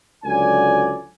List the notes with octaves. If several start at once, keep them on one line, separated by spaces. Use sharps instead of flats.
C#2 D3 F#3 D5 G#5